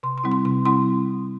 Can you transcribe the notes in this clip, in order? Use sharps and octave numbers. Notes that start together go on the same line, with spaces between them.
C3 C6
C6
G3 C4 E4
C6
C3 C6
G3 C4 E4 C6